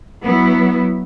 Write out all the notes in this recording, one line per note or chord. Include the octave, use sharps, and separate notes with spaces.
F#3 B3 E4